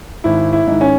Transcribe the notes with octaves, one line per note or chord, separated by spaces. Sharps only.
G#1 E4
E4
G#2 D#3
C#4